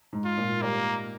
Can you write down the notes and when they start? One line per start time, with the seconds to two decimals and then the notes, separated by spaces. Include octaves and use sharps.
0.13 G#2
0.25 F4
0.37 A#2
0.62 G3 A#3